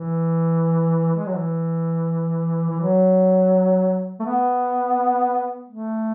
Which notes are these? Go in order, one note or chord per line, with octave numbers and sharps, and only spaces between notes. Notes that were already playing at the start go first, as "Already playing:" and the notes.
Already playing: E3
G#3
F#3
E3
E3
F#3
A3
B3
A3